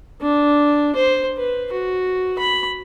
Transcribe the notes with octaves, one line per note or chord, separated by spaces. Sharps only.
D4
C5
B4
F#4
B5